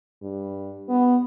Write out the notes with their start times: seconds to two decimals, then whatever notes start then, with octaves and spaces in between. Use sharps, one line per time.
0.22 G2
0.89 B3